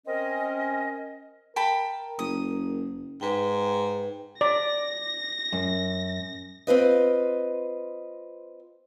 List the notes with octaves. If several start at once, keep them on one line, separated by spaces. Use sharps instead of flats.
C4 C#4 A#4 D#5
A#4 G5 A5 B5
F#1 D#6
G#2 B4 G5
D5 A#6
F#2
C4 F4 B4 D#5